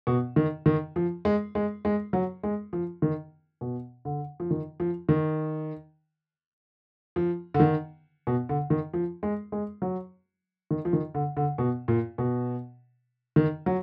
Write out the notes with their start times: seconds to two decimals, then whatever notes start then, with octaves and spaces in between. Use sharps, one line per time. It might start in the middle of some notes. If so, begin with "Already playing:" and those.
0.07 B2
0.36 D#3
0.66 D#3
0.96 F3
1.25 G#3
1.55 G#3
1.85 G#3
2.13 F#3
2.43 G#3
2.73 F3
3.02 D#3
3.61 B2
4.05 D3
4.40 F3
4.51 D#3
4.80 F3
5.09 D#3
7.16 F3
7.54 D3
7.60 D#3
8.27 B2
8.49 D3
8.70 D#3
8.94 F3
9.23 G#3
9.52 G#3
9.82 F#3
10.71 D#3
10.85 F3
10.93 D#3
11.15 D3
11.37 D3
11.58 B2
11.88 A#2
12.18 B2
13.36 D#3
13.66 F#3